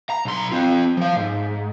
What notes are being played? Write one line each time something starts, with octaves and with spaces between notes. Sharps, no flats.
A#5
B1 C6
C4 F4
F3 F5
G#2